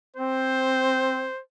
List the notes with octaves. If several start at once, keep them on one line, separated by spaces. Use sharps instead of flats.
C4 C5